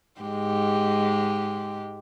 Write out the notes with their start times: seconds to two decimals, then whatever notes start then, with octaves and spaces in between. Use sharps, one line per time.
0.21 G#2 G#3 G4